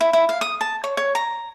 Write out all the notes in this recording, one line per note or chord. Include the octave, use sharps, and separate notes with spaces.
E4
E4
F5
D#6
A5
C#5
C#5
A#5